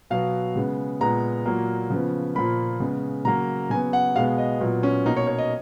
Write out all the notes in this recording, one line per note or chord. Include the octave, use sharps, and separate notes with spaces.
B2 F#3 B3 F5
C#3 G#3 B3
A#2 G#3 B3 A#5
A#2 F#3 A#3
C#3 F3 B3
A#2 F3 A#3 B5
C#3 G#3 B3
C#3 F#3 A#3 A#5
C#3 F#3 B3 G#5
F#5
B2 G#3 B3 F5
D#5
A#2 F#3 B3
C#4
B2 A#3 D#4
C#5
C#5
D#5